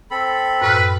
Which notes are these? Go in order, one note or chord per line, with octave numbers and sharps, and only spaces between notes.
C4 A4 B5
F#2 A2 B4 F6